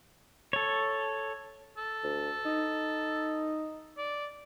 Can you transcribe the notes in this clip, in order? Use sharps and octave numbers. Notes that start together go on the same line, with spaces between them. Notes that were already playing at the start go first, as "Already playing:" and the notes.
A4 C#5
A4
D2
D#4
D5